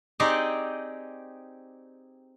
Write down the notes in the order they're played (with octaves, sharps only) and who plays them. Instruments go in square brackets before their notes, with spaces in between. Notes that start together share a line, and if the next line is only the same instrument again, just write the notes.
[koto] C4 D#4 G4 G#4 D5 D#5